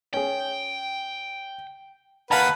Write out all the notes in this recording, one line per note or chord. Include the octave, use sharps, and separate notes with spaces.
C#4 G#4 G5
D#2 B4 F5 F#5 A5 A#5